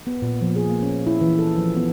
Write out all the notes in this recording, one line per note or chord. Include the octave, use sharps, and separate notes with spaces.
B3
A#2
F3
G#4
A#3
C#4
E4
E3
A4
F3
B3